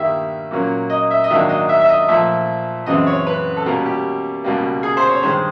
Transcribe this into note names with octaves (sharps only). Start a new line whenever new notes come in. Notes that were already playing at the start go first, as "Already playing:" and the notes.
Already playing: G2 D#3 G3 A#3 E5
A#2 F#3 A#3 C#4
D#5
E5
D#5
G#2 D#3 F#3 A#3 D4 E5
D#5
E5
E5
D#5
A#2 F3 A3 E5
F#2 C#3 E3 G#3 C4 D#5
C#5
B4
A4
B2 G3 A#3 C#4 A#4
G4
C#2 B2 G3 A#3
G#4
C5
C#5
G2 D#3 G#3 C5